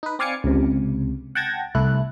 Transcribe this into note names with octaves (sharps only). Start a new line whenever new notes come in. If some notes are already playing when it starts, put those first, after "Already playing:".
D#4 B4
C4 D5 F5 G#5 D6 C#7
C#2 C3
F#5 G5 A5 G#6 A#6
C2 A3 E4 F#6